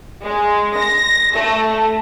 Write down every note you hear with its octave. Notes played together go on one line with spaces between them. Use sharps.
G#3
A#6
A3